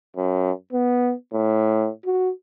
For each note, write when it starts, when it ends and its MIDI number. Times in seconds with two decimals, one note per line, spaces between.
0.16 0.51 42
0.73 1.13 59
1.33 1.89 45
2.06 2.30 66